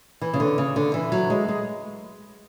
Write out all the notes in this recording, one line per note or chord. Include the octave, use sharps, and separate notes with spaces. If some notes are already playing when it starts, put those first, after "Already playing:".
E3
C#3
D3
C#3
D3
E3
F#3
G#3
G#3